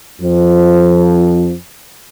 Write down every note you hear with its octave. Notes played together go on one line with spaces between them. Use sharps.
F2 F3